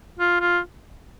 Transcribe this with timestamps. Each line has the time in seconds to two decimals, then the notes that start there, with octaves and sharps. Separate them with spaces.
0.19 F4
0.41 F4